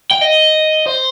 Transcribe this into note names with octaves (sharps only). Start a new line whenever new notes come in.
G5
D#5
C5